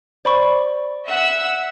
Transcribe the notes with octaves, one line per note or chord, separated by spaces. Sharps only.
C5 D5 B5 C#6
E5 F#5 E6